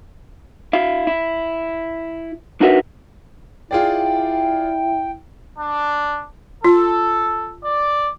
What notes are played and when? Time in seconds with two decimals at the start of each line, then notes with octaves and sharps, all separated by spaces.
0.73 E4 F5
1.07 E4
2.61 D4 D#4 F#4 A#4 B4 E5
3.71 E4 F4 G#4 D5 G5
5.59 D4
6.64 F4 A4
7.65 D5